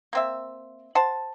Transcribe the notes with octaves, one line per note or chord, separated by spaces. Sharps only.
A#3 C4 E5
C5 F#5 A5